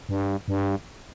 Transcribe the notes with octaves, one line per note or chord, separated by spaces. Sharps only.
G2
G2